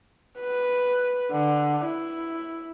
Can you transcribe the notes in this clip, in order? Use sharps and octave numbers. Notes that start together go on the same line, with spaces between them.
B4
D3
E4